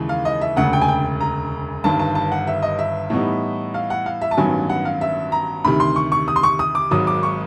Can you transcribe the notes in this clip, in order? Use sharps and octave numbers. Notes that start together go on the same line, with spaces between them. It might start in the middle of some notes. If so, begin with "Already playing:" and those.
Already playing: D#2 C#3 E3 G#3
F5
D#5
E5
E1 D2 C#3 F#5
G5
G#5
G5
A#5
G1 G2 D#3 G3 A5
A5
A5
F#5
E5
D#5
E5
A2 E3 G3 B3 D#4
F5
F#5
F5
E5
A5
A1 G2 D#3 F#3 B3 G#5
F#5
F5
E5
A#5
D2 C3 D#3 B5
C6
C#6
C#6
D#6
C6
C#6
D#6
D6
G#1 G#2 D#3 F#3 D#6
D6
C#6